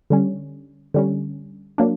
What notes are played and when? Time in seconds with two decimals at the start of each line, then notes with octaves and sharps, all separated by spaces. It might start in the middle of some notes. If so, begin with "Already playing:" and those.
0.10 D3 G3 C#4
0.94 D3 G3 C#4
1.78 F#3 A#3 D4